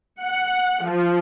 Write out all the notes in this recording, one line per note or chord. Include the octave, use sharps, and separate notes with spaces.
F#5
F3